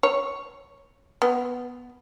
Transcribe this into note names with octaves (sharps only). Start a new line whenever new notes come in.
C#5
B3